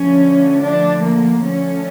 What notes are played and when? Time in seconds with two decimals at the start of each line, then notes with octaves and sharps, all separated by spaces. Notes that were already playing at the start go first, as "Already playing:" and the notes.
Already playing: D3 F3 A3 C#4
0.62 D4
1.03 A#3
1.43 D3 F3 A3 C#4